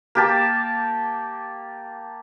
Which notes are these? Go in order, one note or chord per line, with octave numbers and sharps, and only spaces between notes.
A#3 G4 A5